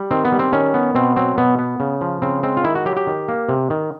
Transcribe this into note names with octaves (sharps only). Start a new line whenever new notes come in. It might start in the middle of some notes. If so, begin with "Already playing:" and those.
Already playing: G3
D#3 C4
B3
G3
C4
D#3 C#4
B3
B2 C4
F#3 C4
B2 B3
B3
C#3
F3
C#3 C4
G#3 C4
F4
D#3 E4
F#4
F#3 G4
G4
D#3
A#3
C3
D#3